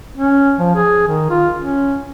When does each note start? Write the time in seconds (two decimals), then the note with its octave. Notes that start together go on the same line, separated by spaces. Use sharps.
0.17 C#4
0.58 F3
0.75 G#4
1.08 D#3
1.30 F4
1.58 C#4